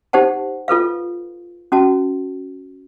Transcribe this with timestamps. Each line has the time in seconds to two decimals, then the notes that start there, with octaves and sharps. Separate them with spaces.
0.13 D#4 G4 C5 F#5 A5
0.68 F4 A4 B4 F5
1.72 C#4 F#4 A5